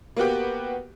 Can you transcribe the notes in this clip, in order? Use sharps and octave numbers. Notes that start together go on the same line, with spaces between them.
A#3 B3 F#4 G4